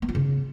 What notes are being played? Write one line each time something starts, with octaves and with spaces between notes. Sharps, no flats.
B3
F4
C#3